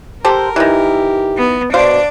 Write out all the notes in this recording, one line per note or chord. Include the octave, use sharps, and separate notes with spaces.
G4 A4 A#4 C5
D#3 E3 G4
B3
B2 D4 C5 D5 F5